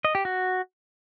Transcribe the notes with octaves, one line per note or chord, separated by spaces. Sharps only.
D#5
G4
F#4